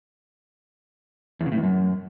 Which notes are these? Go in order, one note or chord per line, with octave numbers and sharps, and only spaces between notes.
E2
C#3
A2
E2
F#2